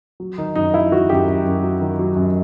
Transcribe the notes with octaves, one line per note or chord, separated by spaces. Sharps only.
F#3
D#3 D#4
F#2 D#4
F#3 E4
D#3 F#4
F#2 G4
F#2
F#2
F#3
D#3
F#3
F#2